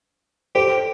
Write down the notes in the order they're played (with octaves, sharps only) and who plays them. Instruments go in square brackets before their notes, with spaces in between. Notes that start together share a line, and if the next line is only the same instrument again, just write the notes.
[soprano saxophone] G4 [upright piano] A4 C5